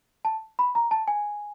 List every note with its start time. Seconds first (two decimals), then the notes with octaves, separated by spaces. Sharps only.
0.25 A5
0.59 B5
0.75 A#5
0.91 A5
1.08 G#5